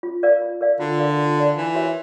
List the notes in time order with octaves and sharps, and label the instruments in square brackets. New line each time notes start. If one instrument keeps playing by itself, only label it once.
[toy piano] F4
A#4 D5 F5
F4
A#4 D5 F5
[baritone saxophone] D3 [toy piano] F4
[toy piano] A#4 D5 F5
F4
A#4 D5 F5
[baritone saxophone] E3 [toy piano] D#4
[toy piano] F#4 A#4 C#5 E5